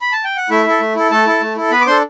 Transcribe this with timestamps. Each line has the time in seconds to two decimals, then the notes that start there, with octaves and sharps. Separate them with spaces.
0.01 B5
0.12 A5
0.24 G5
0.37 F#5
0.50 A3 E4 E5
0.66 E4 A4
0.80 A3
0.96 E4 A4
1.11 A3 A4 A5
1.27 E4 A4
1.41 A3
1.56 E4 A4
1.71 B3 B4 B5
1.81 D6
1.87 D4 A4 C5 C6